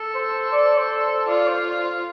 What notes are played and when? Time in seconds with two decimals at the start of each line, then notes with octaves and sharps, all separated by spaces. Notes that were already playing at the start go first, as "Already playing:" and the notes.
Already playing: A4
0.14 C5
0.52 D5
0.78 C5
1.27 F4 D5
1.47 C5